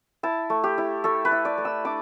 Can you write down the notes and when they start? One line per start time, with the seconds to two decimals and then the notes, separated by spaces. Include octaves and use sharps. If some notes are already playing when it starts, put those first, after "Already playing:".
0.23 E4 A5
0.50 A3
0.64 G4
0.78 E4
1.04 A3 A4
1.25 B4
1.31 E4
1.45 D5
1.58 A3
1.65 E6
1.85 D4 D6